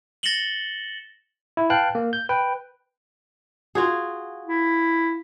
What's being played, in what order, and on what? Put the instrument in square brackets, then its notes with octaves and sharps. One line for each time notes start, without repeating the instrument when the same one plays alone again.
[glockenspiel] A6 A#6 C#7 E7 F#7 G7
[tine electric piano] E4
B4 F5 G5 A5 F#6
A#3
G6
B4 G5
[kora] F4 F#4 G#4
[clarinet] E4